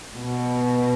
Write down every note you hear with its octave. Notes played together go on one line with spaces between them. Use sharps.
B2